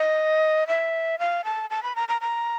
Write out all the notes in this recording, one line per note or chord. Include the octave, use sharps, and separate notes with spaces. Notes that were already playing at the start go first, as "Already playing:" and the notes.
Already playing: D#5
E5
F5
A5
A5
B5
A#5
A#5
A#5